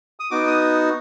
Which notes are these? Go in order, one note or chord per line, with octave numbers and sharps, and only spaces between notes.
D#6
B3 D#4 F#4 D6
D#6